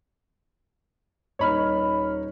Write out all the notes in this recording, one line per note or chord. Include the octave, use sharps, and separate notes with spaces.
D#1 D#4 C#5 B5 F6